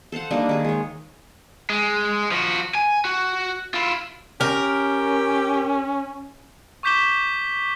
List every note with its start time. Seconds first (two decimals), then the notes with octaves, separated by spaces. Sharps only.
0.12 A4 C5 F5 F#5
0.31 G3 A#3 D4 D#4
0.49 D#3 G#4
0.65 G#3 C#5
1.70 G#3
2.31 F3 F#4
2.75 G#5
3.05 F#4
3.74 E4 F4
4.41 C#4 G4 A#4
6.83 C#6 D6 G6 B6 E7 G7